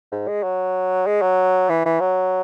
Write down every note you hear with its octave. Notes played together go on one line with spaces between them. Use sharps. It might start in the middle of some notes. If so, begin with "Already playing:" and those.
G#2
G#3
F#3
G#3
F#3
E3
E3
F#3